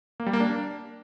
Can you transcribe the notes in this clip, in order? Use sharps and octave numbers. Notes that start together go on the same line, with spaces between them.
A#3
G3
A#3
D4